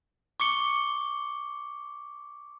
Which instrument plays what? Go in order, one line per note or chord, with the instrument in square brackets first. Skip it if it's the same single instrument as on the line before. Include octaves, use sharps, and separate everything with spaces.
[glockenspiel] C#6 D6 C#7 G7